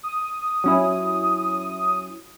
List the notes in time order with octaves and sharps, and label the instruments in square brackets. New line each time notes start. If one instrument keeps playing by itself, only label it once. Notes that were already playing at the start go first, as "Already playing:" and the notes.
[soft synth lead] D#6
[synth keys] F#3 C#4 E4